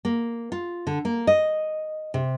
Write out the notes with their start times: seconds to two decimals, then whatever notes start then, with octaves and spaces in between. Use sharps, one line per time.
0.05 A#3
0.52 F4
0.87 D3
1.05 A#3
1.27 D#5
2.14 C3